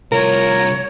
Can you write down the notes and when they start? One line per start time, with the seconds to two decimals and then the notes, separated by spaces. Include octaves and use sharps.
0.12 C2 F4 A#4 C#5